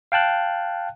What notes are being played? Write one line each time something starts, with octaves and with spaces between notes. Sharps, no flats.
F5 G5 A5 F#6